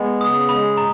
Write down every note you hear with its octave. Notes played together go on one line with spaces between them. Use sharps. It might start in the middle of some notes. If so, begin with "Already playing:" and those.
Already playing: G#3 B3
C#3 D#6
G#3 B5
A#2 A#5